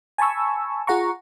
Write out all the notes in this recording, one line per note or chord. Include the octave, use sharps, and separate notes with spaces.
G#5 A5 B5 C#6 E6
F4 G#4 F#5 A#5 C#6